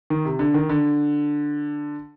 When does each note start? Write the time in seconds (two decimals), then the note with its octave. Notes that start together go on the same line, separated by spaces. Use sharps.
0.10 D#3
0.25 C3
0.39 D3
0.54 D#3
0.70 D3